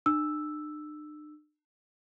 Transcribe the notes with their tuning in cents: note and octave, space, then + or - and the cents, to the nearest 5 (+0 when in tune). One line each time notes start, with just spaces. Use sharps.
D4 +45 E6 +0